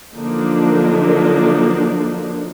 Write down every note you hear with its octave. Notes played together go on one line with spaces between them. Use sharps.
D3 F3 F#3 A#3 D4 D#4